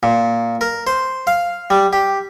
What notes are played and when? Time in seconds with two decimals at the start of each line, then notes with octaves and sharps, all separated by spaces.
0.03 A#2
0.61 A#4
0.87 C5
1.27 F5
1.70 G3
1.93 G4